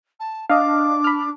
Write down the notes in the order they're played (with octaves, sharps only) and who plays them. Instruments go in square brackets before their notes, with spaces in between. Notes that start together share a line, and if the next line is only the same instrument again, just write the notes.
[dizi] A5
[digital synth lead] D4 [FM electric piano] D#5 F5 [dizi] D6
[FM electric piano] B5 F6